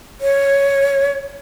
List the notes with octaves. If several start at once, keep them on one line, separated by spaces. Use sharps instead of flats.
C#5